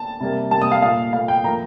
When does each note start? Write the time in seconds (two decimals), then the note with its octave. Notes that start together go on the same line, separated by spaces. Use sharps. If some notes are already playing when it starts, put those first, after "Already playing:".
Already playing: A5
0.20 C3 G3 A#3
0.51 C3 G3 A#3 A5
0.62 D#6
0.72 F5
0.82 A#2 A3 F5
1.13 A#2 A3 F5
1.28 G5
1.44 A2 F3 A#3 A#5